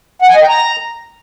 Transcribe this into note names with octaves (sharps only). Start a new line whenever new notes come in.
F#5
G#5
D#5
G5
A#5